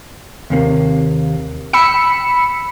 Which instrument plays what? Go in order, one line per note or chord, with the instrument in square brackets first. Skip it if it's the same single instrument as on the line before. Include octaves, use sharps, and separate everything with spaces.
[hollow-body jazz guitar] D#2 C3 A#3
[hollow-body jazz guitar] G5 [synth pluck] B5 E6 C#7